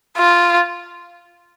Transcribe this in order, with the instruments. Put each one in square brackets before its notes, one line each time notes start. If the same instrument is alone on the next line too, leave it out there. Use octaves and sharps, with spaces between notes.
[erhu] F4